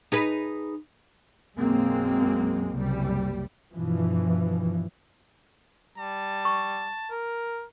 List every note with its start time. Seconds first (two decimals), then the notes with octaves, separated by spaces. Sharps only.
0.12 D#4 G#4 B4
1.57 B1 F#2 G#3 A#3 C4
2.72 F#1 C2 G3
3.74 G2 B2 E3 F3
5.98 G3 A5
6.45 C#6
7.11 A#4